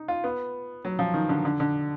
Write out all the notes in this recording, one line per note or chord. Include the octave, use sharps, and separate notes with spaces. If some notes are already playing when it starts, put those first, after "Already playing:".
Already playing: D#4
F4
B3
F#3
F3
D#3
D3
D3
D3